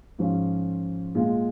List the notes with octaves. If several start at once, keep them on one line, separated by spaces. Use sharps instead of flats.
G#2 F3 C#4 F4
A#2 G#3 F4